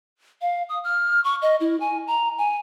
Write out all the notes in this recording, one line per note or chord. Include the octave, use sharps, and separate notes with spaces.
F5
D#6
F6
C#6
D#5
E4
G#5
A#5
G#5